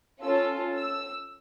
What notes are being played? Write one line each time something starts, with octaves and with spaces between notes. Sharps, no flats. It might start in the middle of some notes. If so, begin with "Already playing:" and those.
C#4 F4 A4 E6
E6